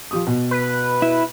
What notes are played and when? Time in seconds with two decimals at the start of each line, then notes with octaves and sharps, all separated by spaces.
0.11 F3 G4 D#6
0.27 B2
0.51 B4
1.02 E4